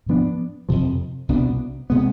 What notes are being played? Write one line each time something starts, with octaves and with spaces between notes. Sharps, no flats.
G#2 F3 B3 D4
F2 C3 F3
C2 B2 B3 D4
C3 G#3 B3